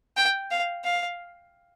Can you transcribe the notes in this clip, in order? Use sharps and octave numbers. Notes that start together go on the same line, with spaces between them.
G5
F5
F5